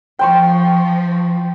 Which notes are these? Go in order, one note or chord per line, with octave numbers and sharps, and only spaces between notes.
F3 G5 C6 C#6